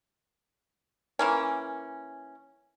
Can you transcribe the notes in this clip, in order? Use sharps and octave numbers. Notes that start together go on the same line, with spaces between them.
E3 A#3 C#4